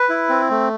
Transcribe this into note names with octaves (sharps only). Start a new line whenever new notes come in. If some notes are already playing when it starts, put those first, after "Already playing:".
Already playing: B4
E4
C4
A3